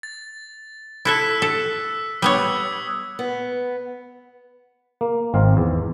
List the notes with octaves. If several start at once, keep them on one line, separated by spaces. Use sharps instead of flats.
A6
E4 A4 E5 E6 F#6 B6
A4
G3 B3 C#5 D#6 E6 G#6
B3
A#3
G#1 C4 F5
E2